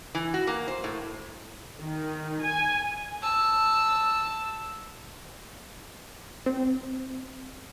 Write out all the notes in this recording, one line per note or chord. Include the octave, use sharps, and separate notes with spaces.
E3
F#4
A#3
C5
A2
D#3
G#5
A5 E6
C4